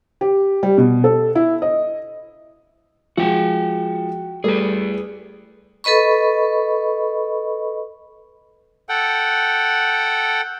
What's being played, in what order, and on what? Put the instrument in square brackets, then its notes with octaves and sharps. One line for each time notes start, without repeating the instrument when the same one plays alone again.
[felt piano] G4
G3
B2
A4
E4
D#5
[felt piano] F3 G#3 [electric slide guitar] F#4 G5
[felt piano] G3 A3 A4 [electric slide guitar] G#4 B4
[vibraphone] A4 B4 D#5 B5 C#6
[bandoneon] A4 F#5 G5